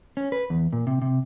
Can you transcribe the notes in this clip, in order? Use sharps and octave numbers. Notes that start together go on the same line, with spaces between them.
C#4
B4
E2
A#2
C3
C3